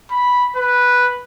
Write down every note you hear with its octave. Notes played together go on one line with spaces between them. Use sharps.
B5
B4